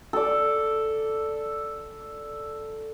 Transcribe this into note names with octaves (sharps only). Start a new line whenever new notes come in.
A4 D5